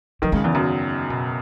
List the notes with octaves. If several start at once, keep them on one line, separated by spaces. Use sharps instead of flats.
D#3 F#3
C#3 G#3
E2 E3
F#2 D#3
B2